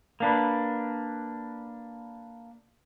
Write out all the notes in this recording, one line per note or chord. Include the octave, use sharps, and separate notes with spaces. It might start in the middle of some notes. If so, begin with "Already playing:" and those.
A#3 D4 B4